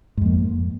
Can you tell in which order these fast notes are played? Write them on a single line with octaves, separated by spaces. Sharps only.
G#2 F2 A#3